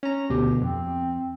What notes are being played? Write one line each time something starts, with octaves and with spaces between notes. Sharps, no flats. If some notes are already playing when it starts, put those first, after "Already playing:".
C#4 A#5
D2 B2 G4
F2 C4